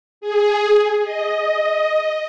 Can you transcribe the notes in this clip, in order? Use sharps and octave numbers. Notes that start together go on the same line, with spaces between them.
G#4
D#5